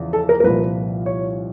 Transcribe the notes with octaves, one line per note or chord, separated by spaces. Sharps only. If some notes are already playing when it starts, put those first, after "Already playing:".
Already playing: E2 C#3 F3
A4
A#4
A#4
C2 A#2 F3 B4
C#5